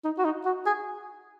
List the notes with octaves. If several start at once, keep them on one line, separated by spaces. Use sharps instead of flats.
D#4
F#4
D#4
F#4
G#4